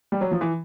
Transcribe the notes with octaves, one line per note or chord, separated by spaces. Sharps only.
G3
F#3
F3
E3